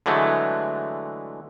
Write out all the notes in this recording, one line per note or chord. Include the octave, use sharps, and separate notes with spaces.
D3 E3 F#3 G#3 A3